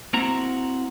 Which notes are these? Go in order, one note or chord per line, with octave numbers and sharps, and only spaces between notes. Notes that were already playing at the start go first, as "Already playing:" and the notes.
A#3 C4 E4 F#4 F#5 A#5